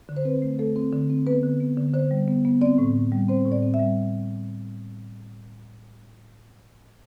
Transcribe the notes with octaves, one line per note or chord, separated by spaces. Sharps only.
D3
C5
C4 B4
A3
A3 A4
C4
D3
C4
B3 B4
D3
B3
D3
D3 C5
G3
B3
B3
C4 D5
A2
A2
G3
C4 C5
A2
D5
C4
E5
G3